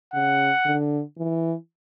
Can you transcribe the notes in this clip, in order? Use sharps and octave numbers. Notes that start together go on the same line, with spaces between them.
C#3 F#5
D3
E3